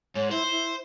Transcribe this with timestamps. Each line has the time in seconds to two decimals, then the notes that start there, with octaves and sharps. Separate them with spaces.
0.15 G#2 C#5
0.31 E4 C5
0.51 E4